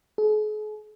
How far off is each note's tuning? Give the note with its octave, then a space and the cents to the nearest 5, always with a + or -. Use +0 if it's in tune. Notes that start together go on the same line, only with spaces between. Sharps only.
G#4 +45